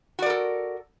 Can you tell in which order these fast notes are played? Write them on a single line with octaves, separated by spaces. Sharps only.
F#4 D5 A#4 A4